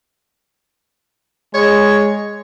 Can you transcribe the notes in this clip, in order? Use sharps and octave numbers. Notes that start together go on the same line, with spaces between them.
G#3 C#5